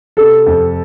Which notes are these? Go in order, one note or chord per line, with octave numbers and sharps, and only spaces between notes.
C3 A4
F2